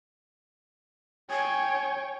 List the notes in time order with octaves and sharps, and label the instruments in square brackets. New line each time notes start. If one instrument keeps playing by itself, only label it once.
[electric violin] C#5 G5 [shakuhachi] G#5